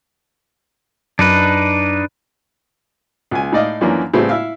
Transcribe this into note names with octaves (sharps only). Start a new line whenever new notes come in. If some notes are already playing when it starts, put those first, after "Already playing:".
F#2 D4 D#4 B4
C#2 G#5
A2 D#4 D5 D#5 F5
F#2 E3 F3 A#3 C#4 D4
A2 C#3 G3 B3 C4
E4 E5 F5